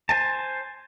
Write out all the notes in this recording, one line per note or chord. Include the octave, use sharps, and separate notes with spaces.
C5 G#5 A5